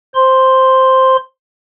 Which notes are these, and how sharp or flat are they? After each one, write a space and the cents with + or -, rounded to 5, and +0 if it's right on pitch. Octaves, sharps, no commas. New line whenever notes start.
C5 +0 C6 +0